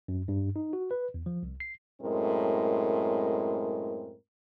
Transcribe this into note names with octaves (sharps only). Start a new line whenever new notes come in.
F#2
G2
D#4
F#4
B4
E2
F3
C2
C7
F#2 A2 G#3 C4 A#4